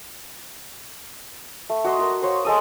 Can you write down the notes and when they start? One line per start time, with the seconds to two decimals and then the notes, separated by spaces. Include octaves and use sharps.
1.70 A3
1.84 F#4 D#5 C6
1.99 F#4 A#4
2.22 C5 C#5 F5
2.45 G#3 A4 D#6